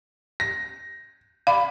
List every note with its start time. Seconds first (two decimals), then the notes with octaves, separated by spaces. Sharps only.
0.40 A#6
1.47 D5 F5 B5